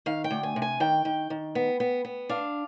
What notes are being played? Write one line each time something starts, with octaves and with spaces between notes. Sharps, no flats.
D#3 F5
G5
D2
G#5
C3
G#5
D#3 G5
D#3
D#3
B3
B3
B3
D4 F5